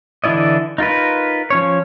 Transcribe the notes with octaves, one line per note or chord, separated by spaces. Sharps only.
D3 E3 E4 D5 D#5
D#4 F4 A#4 B4
F3 C#4 C#5